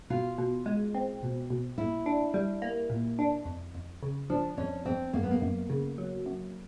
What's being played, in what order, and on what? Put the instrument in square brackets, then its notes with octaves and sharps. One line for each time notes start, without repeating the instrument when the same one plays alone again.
[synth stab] B2 [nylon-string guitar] F4
[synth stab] B2
G#3
C4
B2
B2
[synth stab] A#2 [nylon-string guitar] E4
[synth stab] D4
G3
A#3
A#2
D4
F2
F2
C#3
[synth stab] F3 [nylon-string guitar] D4
[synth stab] F2 [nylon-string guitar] C#4
[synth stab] F2 [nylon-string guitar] C4
[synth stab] F#2 [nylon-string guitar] A#3
[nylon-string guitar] B3
A#3
[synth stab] F#2
C#3
F#3
F#2